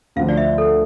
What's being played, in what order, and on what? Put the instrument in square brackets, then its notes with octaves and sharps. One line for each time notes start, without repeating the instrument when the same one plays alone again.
[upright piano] D2 D3 F3 [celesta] F5
[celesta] D5
E5
A4